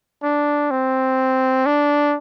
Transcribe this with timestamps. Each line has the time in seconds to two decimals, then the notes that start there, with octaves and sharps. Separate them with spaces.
0.23 D4
0.71 C4
1.66 D4